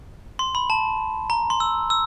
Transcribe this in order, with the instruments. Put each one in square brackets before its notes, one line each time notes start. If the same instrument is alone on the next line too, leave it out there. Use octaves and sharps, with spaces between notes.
[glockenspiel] C6
B5
A5
A#5
C6
E6
E6